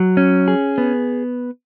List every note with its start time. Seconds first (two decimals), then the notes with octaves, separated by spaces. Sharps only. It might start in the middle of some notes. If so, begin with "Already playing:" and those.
Already playing: F#3
0.17 C#4
0.48 G#4
0.78 B3